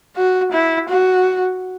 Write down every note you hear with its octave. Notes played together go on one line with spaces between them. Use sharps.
F#4
E4
F#4